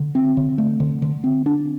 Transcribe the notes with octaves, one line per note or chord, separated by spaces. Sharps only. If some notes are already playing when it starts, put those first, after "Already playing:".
Already playing: D3
C4
D3
A3
D3
D3
C4
D4